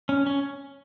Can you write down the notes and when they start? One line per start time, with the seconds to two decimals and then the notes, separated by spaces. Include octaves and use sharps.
0.09 C#4
0.26 C#4